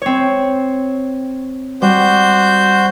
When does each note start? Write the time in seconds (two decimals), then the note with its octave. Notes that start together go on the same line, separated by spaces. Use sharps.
0.02 C4 C#5
1.82 G3 F#4 C5 G6